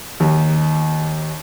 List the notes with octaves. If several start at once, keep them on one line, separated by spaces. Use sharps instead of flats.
D#2